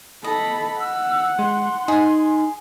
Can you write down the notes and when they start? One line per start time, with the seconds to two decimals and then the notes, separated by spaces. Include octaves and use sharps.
0.24 A4 D#5 B5
0.80 F#5 E6
1.39 G#3 C6
1.88 D#4 G#4 G#5